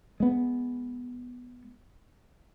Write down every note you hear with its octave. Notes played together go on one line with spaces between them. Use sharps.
G#3 B3